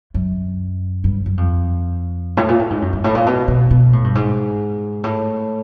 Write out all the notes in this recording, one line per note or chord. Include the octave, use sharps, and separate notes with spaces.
F#2
G2
F#2
F2
A2
A#2
A2
G#2
F#2
G2
A2
A#2
B2
B2
B2
A2
G2
G#2
A2